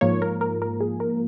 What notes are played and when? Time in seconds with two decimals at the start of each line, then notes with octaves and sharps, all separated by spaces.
0.01 G#2 F3 A#3 C#5
0.22 A#4
0.41 A#4
0.62 A#4
0.80 G#4
1.00 A#4